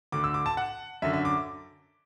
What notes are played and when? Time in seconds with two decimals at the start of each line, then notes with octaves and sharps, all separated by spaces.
0.12 D2 D3 D6
0.24 E6
0.34 D6
0.46 A5
0.57 F#5
1.02 F#2 D3 E5
1.13 E5
1.25 D6